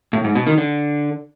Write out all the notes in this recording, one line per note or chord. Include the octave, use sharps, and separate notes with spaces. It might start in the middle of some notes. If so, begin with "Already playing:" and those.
A2
G#2
B2
D#3
D3